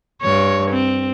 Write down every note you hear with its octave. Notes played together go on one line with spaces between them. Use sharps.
G2 C#5
C4